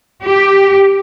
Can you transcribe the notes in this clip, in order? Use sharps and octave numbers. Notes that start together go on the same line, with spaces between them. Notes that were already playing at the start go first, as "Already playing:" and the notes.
G4